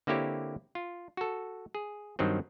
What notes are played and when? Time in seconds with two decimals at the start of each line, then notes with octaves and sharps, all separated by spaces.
0.07 D3 A#3 C4 E4 G4 C#5
0.75 F4
1.17 F#4 A4
1.75 G#4
2.19 G2 D#3 F#3 C4